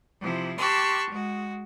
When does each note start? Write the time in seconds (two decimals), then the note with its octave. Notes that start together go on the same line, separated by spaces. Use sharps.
0.21 C3 F3 E4
0.58 G4 A5 C6 C#6 E6 F#6
1.09 G#3 F#4